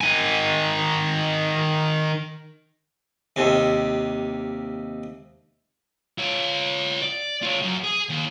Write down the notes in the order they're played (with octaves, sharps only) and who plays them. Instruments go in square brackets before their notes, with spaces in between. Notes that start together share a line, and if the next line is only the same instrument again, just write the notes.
[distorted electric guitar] D#3 G#5
[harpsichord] D#2 C3
[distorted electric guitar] F4 C#5
D5
F4 C#5
F#2
G#4
D#2